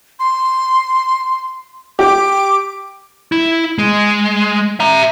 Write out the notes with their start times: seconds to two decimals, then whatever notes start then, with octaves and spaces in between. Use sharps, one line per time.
0.19 C6
1.99 G4 D6
3.32 E4
3.78 G#3
4.80 E5 A#5